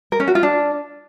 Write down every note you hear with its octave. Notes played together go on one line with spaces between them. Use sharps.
A#4
C#4
F#4
F4
D4